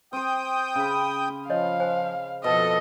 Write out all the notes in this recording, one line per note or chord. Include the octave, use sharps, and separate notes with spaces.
C4 C5 G5 D#6 G6
C#3 B5
F3 C#5 D#5 F5 G#5
C5 G#5
F2 B2 A4 D#5